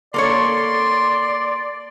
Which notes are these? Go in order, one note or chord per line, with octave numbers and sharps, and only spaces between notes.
A#3 A4 C#5 D5 C6